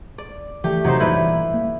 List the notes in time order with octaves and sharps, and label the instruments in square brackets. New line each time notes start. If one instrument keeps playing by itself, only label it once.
[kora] D5
[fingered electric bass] E3 [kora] A3 G4
[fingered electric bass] E2 C3 [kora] F#3 D#4 C5
[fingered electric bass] G2 A#2 E3 [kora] E4 B4 D5
[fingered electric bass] A#3